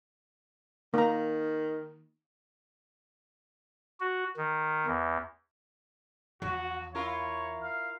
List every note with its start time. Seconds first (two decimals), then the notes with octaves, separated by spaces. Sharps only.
0.94 D#3 A#3 A#5
4.00 F#4
4.37 D#3
4.86 E2
6.42 E2 F3 F#4
6.95 E4 F4 A#4 C#5
7.62 F5